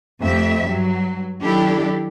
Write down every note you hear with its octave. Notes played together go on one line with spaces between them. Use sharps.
F2 A3 G4 E5
G2 F#3
D#3 F#3 D4 E4 G4 A4